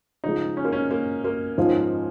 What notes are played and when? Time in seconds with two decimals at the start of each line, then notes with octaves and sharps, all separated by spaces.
0.24 C#3 F3 G#3 D#4
0.57 C#4
0.65 A#3
0.72 C#4
0.91 A#3
1.24 A#3
1.58 G#2 F3 C#4 F4